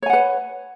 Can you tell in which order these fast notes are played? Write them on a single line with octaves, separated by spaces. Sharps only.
C#5 G#5 F#5 B4